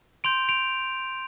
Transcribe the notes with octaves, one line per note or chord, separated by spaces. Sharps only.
C6 G6 D7 F7
D7 F7